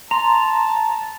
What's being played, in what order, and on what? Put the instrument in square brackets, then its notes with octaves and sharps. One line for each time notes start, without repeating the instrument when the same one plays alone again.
[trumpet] A5 [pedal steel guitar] A#5 [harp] C6